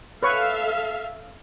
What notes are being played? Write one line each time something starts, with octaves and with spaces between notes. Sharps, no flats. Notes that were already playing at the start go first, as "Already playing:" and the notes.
A4 B4 C#5 E5 F5 C#6